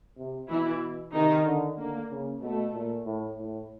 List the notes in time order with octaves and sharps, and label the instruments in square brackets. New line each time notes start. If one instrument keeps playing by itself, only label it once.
[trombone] C3
[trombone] B2 [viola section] E3 E4
[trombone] C3 [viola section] D#3 D#4
[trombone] D3
[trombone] D3 [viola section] A#3
[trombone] C#3
[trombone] B2 [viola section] A3
[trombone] A#2
A2
A2